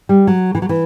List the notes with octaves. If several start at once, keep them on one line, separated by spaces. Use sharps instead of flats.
G3
F#3
E3
F#3
E3